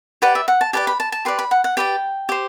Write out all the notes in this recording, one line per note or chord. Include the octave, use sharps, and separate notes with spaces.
G4 B4 D5 F#5
E5
F#5
A5
G4 B4 D5 A5
B5
A5
A5
G4 B4 D5 C6
B5
F#5
F#5
G4 B4 D5 G5
G4 C5